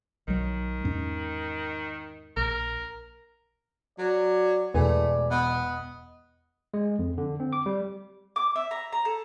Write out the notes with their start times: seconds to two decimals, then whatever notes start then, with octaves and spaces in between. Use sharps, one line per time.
0.28 B1 D#3 F#3
0.84 E2 G#2 C#4
2.37 A#1 A#4
3.98 F#3 D5
4.74 E1 E2 A3 B4 D5 G#5
5.31 B3 D#5
6.74 G#3
6.99 F2
7.18 D3
7.40 C4
7.53 D6
7.66 G3
8.36 D6
8.56 E5
8.71 A#5
8.92 A#5
9.05 A4